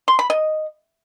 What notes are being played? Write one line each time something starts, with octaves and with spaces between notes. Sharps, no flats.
C6
B5
D#5